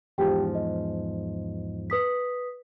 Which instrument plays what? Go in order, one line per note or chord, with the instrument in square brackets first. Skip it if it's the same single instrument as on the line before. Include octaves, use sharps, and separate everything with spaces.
[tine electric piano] E2 G#2 F3 [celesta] G4 G5
[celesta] D#5
B4 D#6 B6